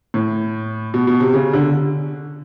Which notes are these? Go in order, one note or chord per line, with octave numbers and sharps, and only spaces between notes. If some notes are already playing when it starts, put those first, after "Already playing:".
A2
B2
B2
C3
C#3
D3